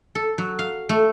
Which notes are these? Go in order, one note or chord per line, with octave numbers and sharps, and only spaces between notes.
A4
F#3
F5
A3